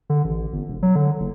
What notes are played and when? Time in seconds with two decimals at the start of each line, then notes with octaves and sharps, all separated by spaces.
0.10 D3
0.24 A1
0.53 G1
0.68 E1
0.83 F#3
0.96 D3
1.20 F#1